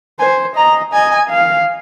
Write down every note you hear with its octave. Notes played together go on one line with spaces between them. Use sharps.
C5 G#5
D#5 A#5
D#5 G#5
F5